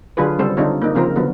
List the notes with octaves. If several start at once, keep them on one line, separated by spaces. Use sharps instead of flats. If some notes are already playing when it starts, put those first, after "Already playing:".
D3 F#3 D4 F4 G#4 B4
C#3 G3 C4 A4 C5
D3 C4 D4 D#4 F4 C#5
A#3 D#4
C#3 F3 C4 F4 A#4 C5
D3 F#3 B3